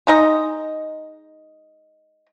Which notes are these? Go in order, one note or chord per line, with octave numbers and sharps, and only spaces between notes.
G#3 D#4 D#5